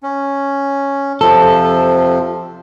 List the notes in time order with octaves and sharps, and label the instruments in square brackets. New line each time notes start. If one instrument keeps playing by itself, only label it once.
[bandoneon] C#4
[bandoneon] F2 C3 F3 [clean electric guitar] A4